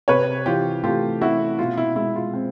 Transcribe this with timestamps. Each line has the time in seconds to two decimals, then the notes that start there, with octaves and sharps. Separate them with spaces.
0.08 C3 B4 C#5
0.46 E3 F4 G4
0.84 A3 F4 G4
1.21 C#4 E4 F#4
1.59 B2 F4
1.77 E4
1.96 G#3 E4
2.16 F4
2.34 C4